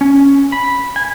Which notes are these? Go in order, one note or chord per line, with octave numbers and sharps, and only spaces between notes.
C#4
B5
G#5